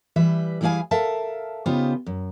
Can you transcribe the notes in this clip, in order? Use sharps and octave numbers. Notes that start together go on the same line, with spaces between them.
E3 G3 B4 E5
E3 G3 E4 G#4 F5 G#5
A4 A#4 E5 F5 A5
C#3 B3 D#4 F4 G4 C5
F#2